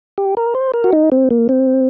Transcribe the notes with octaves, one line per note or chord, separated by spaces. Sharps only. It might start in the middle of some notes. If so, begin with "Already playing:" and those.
G4
A#4
C5
A#4
F#4
D#4
C4
A#3
C4